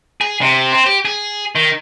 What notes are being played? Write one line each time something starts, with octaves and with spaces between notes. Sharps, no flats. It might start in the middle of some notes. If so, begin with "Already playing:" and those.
G#4
C3
C4
G4
G#4
D#3